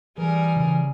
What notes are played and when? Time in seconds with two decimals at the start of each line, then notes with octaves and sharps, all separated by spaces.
0.18 E3 G3 G#4 A#4
0.56 C#3